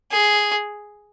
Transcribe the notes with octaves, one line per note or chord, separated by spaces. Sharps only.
G#4